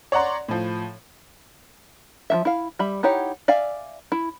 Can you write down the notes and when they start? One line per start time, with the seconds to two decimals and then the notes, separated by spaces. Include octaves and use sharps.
0.12 C#5 D5 F#5 A#5 C6
0.48 A2 F3
2.30 F3 F#3 E5
2.45 E4 F5
2.79 G3 E5 B5
3.03 D#4 E4 G4 C#5 F#5
3.48 D5 E5 F5 G#5
4.12 E4